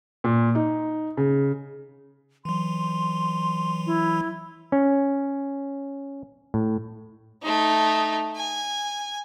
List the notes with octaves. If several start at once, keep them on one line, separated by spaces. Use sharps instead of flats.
A#2
D#4
C#3
E3 F#3 C6
E4
C#4
A2
A3 D#4
G#5